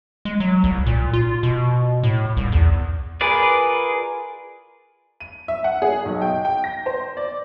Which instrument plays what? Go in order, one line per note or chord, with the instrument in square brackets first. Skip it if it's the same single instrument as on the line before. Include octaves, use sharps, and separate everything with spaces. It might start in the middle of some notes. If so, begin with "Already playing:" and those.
[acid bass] G#3
F#3
C2
A#2
F4
B2
A2
C2
E2
[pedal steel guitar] F4 G#4 A#4 B4 D5
[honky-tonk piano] D#7
E5
F#5
G#4
B1
G5
G5
A#6
C5
D5